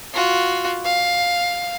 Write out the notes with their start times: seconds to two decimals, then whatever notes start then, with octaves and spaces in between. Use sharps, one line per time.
0.13 F4 F#4
0.85 F5